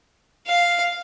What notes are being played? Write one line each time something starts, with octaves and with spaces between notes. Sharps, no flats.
F5